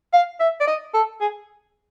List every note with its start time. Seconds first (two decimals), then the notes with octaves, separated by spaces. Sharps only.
0.13 F5
0.40 E5
0.61 D5
0.67 D#5
0.94 A4
1.21 G#4